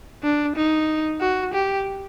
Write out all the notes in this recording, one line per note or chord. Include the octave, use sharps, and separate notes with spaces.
D4
D#4
F#4
G4